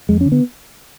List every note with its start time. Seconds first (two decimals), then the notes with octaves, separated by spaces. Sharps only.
0.09 F2 G#3
0.21 C#4
0.26 D3
0.32 B3